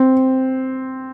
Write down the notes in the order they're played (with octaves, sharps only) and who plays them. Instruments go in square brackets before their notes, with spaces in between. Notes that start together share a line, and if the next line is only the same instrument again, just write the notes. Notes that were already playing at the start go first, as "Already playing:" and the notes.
Already playing: [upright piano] C4